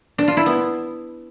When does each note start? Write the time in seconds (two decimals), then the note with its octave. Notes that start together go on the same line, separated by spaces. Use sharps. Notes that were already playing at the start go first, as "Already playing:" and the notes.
0.18 D4
0.28 F4
0.37 E4
0.46 B3